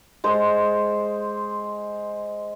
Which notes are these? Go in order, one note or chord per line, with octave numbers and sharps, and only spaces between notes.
G#3 C5